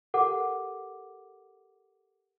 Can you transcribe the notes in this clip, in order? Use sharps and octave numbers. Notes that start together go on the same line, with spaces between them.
G4 A4 A#4 F#5 D6